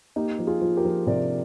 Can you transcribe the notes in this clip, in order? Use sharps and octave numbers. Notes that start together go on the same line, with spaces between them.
A#3 D#4 G4
F3
F4 G#4
F3
G4 A#4
F3
C3 A#4 D5